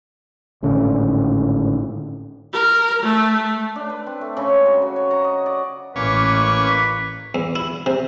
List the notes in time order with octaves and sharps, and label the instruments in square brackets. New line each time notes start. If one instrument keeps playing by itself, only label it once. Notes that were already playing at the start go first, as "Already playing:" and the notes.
[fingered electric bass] G#1 A2 D3 C#4
[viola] A#4
A3
[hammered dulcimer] D4
B4
C4
A3
C#3
G#3
F#3
F#4
C#5
A#5
D#5
D5
[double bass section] A1 [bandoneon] A#3 C#6 D6 [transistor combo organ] C#4 [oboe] B4
[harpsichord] E2
E4
C3